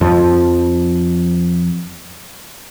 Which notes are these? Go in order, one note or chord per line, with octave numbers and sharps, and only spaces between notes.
F2 F3